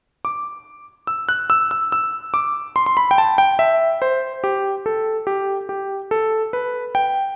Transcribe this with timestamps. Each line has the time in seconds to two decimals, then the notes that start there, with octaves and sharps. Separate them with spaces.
0.25 D6
1.07 E6
1.29 F#6
1.50 E6
1.71 E6
1.92 E6
2.34 D6
2.76 C6
2.86 C6
2.97 B5
3.11 G5
3.18 A5
3.38 G5
3.59 E5
4.02 C5
4.44 G4
4.86 A4
5.27 G4
5.69 G4
6.11 A4
6.53 B4
6.95 G5